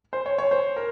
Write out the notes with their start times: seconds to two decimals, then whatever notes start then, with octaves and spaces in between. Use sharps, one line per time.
0.13 C5
0.26 C#5
0.38 C#5
0.51 C5
0.76 A#4